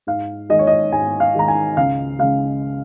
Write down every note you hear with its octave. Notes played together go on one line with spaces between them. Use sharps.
G#2 F5
D#3 G#3 D#5
C#5
D#5
G#2 G#5
F5
D#3 G#3 A#5
G#5
C#2 F5
C#3 G#3 F5